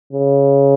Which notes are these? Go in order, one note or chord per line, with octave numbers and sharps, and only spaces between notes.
C#3